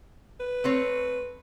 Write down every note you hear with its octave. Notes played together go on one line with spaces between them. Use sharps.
B4
A3 C4 C#5